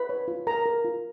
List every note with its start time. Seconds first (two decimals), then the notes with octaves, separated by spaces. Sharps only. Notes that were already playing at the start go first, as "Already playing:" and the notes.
Already playing: B4 B5
0.09 C#5
0.28 F4
0.47 A#4 A#5
0.66 A#4
0.85 F4